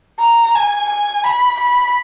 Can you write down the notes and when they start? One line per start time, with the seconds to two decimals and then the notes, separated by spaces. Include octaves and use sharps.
0.19 A#5
0.55 G#5
0.89 G#5
1.24 B5
1.59 B5